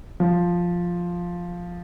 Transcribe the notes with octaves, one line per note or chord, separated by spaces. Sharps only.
F3